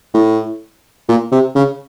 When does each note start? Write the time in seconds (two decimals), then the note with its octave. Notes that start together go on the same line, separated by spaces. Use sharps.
0.14 A2
1.09 A#2
1.32 C3
1.55 C#3